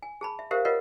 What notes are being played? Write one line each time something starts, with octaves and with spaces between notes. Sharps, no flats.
G#5
G#4 A5 B5
E5
G4 A#4 C5 E5 F5
F4 A#4 B4 C#5 D#5 F#5